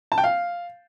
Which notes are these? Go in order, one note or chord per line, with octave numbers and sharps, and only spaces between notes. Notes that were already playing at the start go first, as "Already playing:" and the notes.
A5
G5
F5